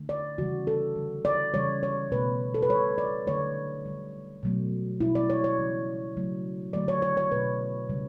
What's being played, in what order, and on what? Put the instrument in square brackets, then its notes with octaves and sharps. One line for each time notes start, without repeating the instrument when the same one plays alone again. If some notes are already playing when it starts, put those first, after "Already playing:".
Already playing: [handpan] D3 A3
D5
C#3 E3 G3 F#4
A4
D3 G3
D5
C#3 E3 G3 C#5
C#5
B2 A3 B4
A4
B4
B2 G3 C#5
D5
D3 F#3 A3 C#5
D3 G3
B2 F#3 A3
B2 G3 E4
D5
C#5
C#5
C#3 E3 G3
C#3 F#3 A3
D3 F#3 A3 D5
C#5
C#5
C#5
B2 A3 B4
C#3 G3